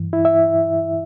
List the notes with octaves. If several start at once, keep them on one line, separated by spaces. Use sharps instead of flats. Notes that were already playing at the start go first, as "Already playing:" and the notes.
Already playing: G2 E3
E4
E5